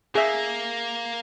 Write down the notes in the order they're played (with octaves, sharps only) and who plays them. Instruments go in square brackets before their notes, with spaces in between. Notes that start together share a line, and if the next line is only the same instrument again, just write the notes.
[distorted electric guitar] A#3 [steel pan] G#4 E5